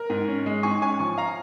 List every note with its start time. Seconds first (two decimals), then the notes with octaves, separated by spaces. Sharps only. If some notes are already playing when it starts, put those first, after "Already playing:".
Already playing: A#4
0.10 G#2
0.28 C#4
0.46 G#3
0.63 G#2 G#5 C#6
0.81 C#4 G#5 C#6
0.99 F3 G#5 C#6
1.18 F5 A#5